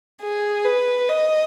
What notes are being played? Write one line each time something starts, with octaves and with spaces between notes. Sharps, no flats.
G#4
B4
D#5